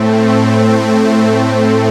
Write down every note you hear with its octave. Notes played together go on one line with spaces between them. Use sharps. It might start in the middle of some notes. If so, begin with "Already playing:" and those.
Already playing: A2 A3 C4